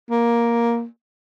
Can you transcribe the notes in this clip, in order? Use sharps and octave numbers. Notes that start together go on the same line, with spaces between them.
A#3